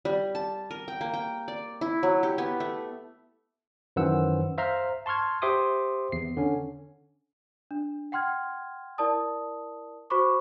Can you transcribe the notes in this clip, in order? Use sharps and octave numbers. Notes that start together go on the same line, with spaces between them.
G3
A5
A#4
G5
A#3
G5
D5
E4
F#3
G4
B3
A3
F#2 D#3 E3 C5 F#5 E6
C5 E5 F5 A#5 C6 F6
A5 C6 C#6 F6 G#6
G4 C5 E5 C6 D6 D#6
E2 C7
D3 C#4
D4
F#5 G5 C6 F6 G#6
E4 A#4 D5 A5 D#6
F#4 C5 B5 C#6 D6